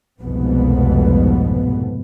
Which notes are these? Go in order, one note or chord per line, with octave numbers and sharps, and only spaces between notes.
F1 C2 F2 G#2 B2 B3